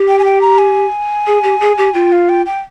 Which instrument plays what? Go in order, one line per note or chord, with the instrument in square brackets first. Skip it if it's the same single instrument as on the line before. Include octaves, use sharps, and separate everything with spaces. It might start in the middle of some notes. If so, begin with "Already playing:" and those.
Already playing: [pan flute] G4
[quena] G5
G#5
G5
A#5
G#5
[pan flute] G#4
G4
G#4
G4
[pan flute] F4 [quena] G5
[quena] F5
G5
G5